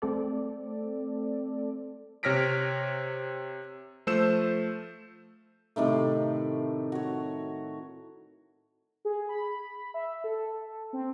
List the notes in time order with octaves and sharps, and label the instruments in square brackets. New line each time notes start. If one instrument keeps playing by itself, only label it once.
[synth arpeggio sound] A3 C4 A4 D5
[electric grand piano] C3 C#5 F6 A#6 B6 D7
F3 A3 C5 E6 G6 E7
[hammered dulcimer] A2 C3 D#3 A3
F#4 C#5
[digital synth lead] G#4
B5
E5
A4
C4